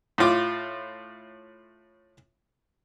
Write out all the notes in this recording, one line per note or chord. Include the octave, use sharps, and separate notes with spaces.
A2 F4 D6